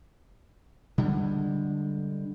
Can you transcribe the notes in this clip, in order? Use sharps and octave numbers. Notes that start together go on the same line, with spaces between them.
D3 G3 G#3